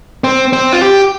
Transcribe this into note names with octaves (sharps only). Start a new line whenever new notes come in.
C4
C4
F4
G4